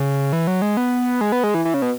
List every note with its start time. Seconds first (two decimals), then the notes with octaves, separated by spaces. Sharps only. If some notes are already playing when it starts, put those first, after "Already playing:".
Already playing: C#3
0.33 E3
0.47 F#3
0.62 G#3
0.77 B3
1.21 G#3
1.32 B3
1.44 G#3
1.54 E3
1.65 E3
1.74 C#3
1.82 B2